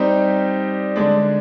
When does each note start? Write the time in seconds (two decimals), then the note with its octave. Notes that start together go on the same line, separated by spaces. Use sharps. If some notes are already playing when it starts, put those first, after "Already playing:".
Already playing: G3 C4 D#4 G4
0.96 D3 G#3 D4